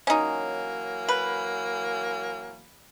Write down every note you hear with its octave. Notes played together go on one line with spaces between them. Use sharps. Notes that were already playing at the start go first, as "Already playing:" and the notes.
E3 F#3 A#3 C#4 D#4
B4